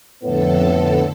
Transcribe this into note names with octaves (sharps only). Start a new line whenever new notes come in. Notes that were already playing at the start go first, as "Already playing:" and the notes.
F2 A2 D3 B3 A4